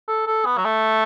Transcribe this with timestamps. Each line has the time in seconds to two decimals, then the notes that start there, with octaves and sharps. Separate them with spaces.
0.08 A4
0.27 A4
0.45 B3
0.57 F#3
0.65 A3